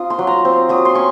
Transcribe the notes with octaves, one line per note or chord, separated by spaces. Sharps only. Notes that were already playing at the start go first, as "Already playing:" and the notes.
Already playing: C4 D#4 F4 D#6
C6
F#3
A#5
C4
F#3 D#6
C6
C#4 C#6